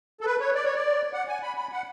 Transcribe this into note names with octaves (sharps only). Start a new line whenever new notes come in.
A4
B4
C#5
D5
C#5
D5
F#5
G#5
B5
B5
F#5